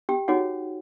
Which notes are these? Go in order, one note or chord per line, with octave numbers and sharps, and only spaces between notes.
G4 G5
D#4 F#4 G#4 C#5 F#5